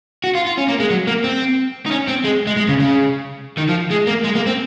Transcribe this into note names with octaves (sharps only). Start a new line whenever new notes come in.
F#4
F4
F4
C#4
A#3
G#3
F#3
A#3
C4
D#4
C#4
C4
G#3
G#3
G#3
C#3
C#3
D#3
F3
G#3
A#3
G#3
A#3
C4